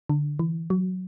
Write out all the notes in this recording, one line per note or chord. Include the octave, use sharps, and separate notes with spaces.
D3
E3
F#3